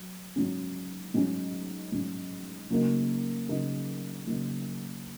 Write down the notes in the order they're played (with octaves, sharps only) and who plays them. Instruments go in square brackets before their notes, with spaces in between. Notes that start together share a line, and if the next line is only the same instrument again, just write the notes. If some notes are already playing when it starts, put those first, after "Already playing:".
Already playing: [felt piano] F#3
G#2 F#3 C#4
G#2 F#3 C#4
G#2 F#3 C#4
C#3 F#3 A#3 D#4 A#4
C#3 F#3 A#3 D#4 A#4
C#3 F#3 A#3 D#4 A#4